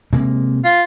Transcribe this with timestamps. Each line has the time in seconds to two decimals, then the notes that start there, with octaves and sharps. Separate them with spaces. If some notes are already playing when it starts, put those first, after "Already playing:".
0.13 C3 G#3 A#3
0.65 F4